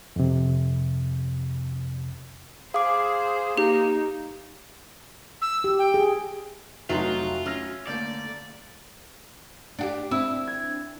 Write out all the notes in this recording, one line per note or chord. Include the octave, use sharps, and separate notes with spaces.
F2 C3
G#4 C5 F5 D6
A#3 D#4 G4
E6
G4
G5
G#4
F1 F#3 A3 D#4 F4 F#4 E5 C6
C#4 E6 F6 A#6
D3 A3 A#3 D5 G6
D4 F#4 G4
C4 D4 E4 E6
G#6